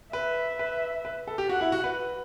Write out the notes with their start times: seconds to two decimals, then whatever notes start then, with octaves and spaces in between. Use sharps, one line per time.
0.13 B4 E5
0.59 B4
1.05 B4
1.27 A4
1.38 G4
1.49 F#4 F#5
1.61 E4
1.72 F#4
1.84 B4